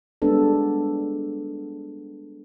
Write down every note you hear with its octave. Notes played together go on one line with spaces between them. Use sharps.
G3 G#3 B3 D4 A4